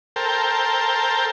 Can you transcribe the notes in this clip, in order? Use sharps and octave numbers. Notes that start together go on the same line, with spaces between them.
A4 A#4 C5 G5